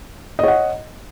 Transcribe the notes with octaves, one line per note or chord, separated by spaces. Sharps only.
C#5 D#5 F#5